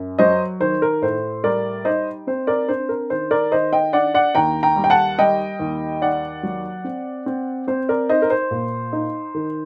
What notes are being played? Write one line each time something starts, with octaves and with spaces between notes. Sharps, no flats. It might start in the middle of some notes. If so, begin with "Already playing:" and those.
Already playing: F#2
F#3 C5 D#5
D#3 C5
A#4
A2 C5
G3 A#4 D5
D#4 C5 D#5
C4 C5
A#4 D5
D4 C5
A#4
D#3 C5
A#4 D5
D#3 C5 D#5
D#5 G5
D4 D5 F#5
D5 F#5
D#2 G5 A#5
G5 A#5
G3
G5
F#5 A5
G3 D#5 G5
D#2
D#4 D5 F#5
F#3
C4
C4
C4 C5
A#4 D5
D#4 C5 D#5
A#4
C5
A#2
D#4
D#3